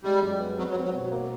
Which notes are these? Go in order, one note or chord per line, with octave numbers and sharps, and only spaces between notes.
G3 G#3
F#2
B3
F#3 C4
F#3
C4
F#3
B2
A#3